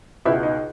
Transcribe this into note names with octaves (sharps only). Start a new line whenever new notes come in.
C#2 B2 E4
D#4